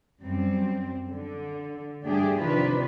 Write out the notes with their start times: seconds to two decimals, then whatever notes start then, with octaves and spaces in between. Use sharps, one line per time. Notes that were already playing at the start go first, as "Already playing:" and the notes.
0.23 F#2 G3 C4
1.10 D3
2.05 G2 A3 D4 G4 G#4
2.39 C3 D#3 F3 D4 F4 B4